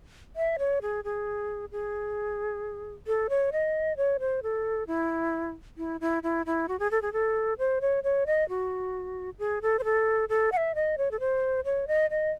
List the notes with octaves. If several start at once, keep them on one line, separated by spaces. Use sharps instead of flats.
E5
C#5
G#4
G#4
G#4
A4
C#5
D#5
C#5
C5
A4
E4
E4
E4
E4
E4
F#4
G#4
A4
G#4
A4
C5
C#5
C#5
D#5
F#4
G#4
A4
C5
A4
A4
F#5
E5
D#5
C#5
A4
C5
C#5
D#5
D#5